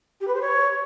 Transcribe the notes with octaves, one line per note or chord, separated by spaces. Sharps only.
G4
B4
C5
C#5